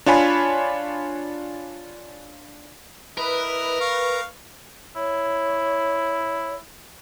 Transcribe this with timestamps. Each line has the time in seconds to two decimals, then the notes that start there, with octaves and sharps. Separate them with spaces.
0.06 D4 F4 C#5 G#5 B5
3.17 E4 A#4 B4 D#5
3.81 F5 C#6
4.96 E4 C#5